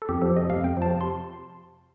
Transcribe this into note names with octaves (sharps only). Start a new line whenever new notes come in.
A4
F2 G4
F3 A4
C3 D#5
F2 F5
F2 G5
F3 A5
C3
C6